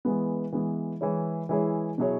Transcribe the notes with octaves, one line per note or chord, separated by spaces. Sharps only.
E3 G#3 B3
E3 G#3 B3
E3 G#3 E4 G#4 C#5
E3 G#3 E4 G#4 C#5
B2 F#3 E4 G#4 C#5